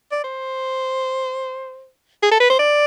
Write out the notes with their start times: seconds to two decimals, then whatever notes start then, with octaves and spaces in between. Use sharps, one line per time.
0.12 D5
0.24 C5
2.23 G#4
2.32 A4
2.40 B4
2.50 C5
2.59 D5